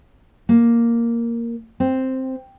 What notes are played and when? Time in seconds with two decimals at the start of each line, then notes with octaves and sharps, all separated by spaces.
0.49 A#3
1.80 C4